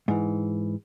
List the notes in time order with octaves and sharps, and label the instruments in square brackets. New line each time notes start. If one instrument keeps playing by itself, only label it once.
[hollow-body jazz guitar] G#2 E3